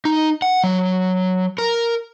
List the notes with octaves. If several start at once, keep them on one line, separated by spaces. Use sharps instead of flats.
D#4
F#5
F#3
A#4